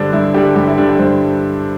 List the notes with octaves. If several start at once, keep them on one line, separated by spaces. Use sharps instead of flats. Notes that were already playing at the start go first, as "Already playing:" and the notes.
Already playing: G2 D3 G3 D4 C5
G2 E4
D3 G3 G4
G2 G4
E4
D3 G3 D4
G4
G2 C5